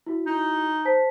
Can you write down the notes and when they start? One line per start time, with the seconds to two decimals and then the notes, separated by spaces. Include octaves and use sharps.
0.06 E4 F#4
0.26 D#4
0.85 C5 A5 B6